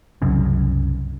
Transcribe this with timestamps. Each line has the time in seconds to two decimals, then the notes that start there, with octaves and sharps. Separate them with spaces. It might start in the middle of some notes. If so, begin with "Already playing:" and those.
0.22 C2 F#2 C#3